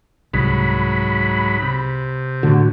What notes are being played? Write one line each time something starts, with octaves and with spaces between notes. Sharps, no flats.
C2 G#2 F#3 B5
C3
A2 D3 F#4